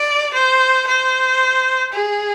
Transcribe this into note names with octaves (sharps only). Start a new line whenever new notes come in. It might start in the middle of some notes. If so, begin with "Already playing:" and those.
Already playing: D5
C5
C5
G#4